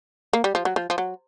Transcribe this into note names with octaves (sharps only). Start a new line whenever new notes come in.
A#3
G3
F3
F#3
F3
F3
F#3